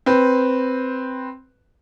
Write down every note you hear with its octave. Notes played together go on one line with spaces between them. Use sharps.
C4 B4